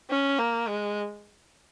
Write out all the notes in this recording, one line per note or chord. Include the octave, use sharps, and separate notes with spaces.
C#4
A#3
G#3